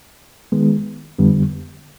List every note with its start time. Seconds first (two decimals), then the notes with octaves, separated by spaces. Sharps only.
0.52 D#3 G#3 B3
1.18 F2 D3 G3 B3